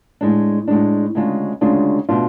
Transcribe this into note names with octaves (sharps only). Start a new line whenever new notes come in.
A2 G#3 D4
A2 G#3 D4
D2 C#3 G#3 D4 F4
D2 C#3 G#3 D4 F4
B2 A3 D4 F4